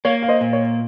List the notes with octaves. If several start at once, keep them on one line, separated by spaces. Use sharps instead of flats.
A#3 C#5 F5
F5
C5 D#5
A#2
C#5